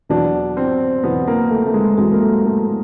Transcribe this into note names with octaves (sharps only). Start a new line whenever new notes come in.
E2 B2 F#3 D4
C4
E2 B2 F#3 B3
A#3
A3
A3
G#3
E2 B2 F#3 G#3
A#3
A3
A3
A#3